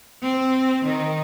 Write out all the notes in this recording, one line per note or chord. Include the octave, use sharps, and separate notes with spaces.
C4
D#3